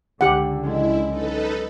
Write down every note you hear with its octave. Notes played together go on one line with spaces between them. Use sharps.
C#2 D3 G4 F#5
F#3 G#3 C#4 E4
D#4 A4 B4